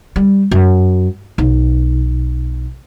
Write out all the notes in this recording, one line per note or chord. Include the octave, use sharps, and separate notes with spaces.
G3
F#2
B1